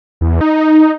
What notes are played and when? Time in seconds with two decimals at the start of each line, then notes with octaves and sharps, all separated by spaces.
0.21 E2
0.41 D#4